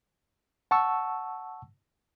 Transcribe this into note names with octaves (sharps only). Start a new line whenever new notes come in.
F#5 A5 C#6 E6